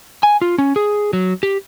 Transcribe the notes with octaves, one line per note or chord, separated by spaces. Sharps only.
G#5
F4
C#4
G#4
F#3
G4